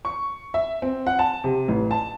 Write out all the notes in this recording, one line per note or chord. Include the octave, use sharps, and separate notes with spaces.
C#6
E5
C4
F#5
A5
C3
A1
A5